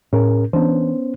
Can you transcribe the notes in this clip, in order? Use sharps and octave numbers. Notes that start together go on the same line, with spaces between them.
A2 C#4 G#4 A#4
E3 B3 C#4 D4 C5